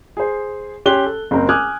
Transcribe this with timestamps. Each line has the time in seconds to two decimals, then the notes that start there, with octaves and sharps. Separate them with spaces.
0.17 G#4 C5
0.86 C#4 G4 C6 F#6 G7
1.06 A4
1.31 F#1 C4 A#4
1.49 G#5 D6 D#6 F6 F#6 G#6